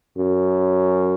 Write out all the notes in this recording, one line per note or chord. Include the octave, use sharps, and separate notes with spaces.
F#2